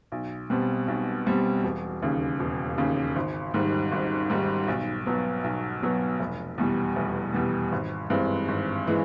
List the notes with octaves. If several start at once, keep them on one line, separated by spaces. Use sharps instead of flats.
B1
B2 G3 C4
B1
B2 G3 C4
E1
D#2 C#3
E1
D#2 C#3
G#1
G#2 D#3 G3
G#1
G#2 D#3 G3
B1
B2 F#3 B3
B1
B2 F#3 B3
F1
E2 B2 G3
F1
E2 B2 G3
G#1
G2 E3 G#3 C4
G#1
E3 G#3